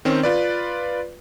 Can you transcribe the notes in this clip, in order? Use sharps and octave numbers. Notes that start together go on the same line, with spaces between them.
D#3 C4 C#4
F4 B4 D5